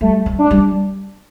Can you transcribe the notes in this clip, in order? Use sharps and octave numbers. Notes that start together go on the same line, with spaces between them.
G3 A3
A3
D4
G3